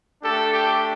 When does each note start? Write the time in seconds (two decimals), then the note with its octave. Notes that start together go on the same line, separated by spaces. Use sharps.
0.23 A3 D4 G4 A4
0.52 G4